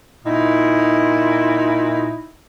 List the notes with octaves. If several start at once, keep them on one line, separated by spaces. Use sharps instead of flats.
A#2 D#4 E4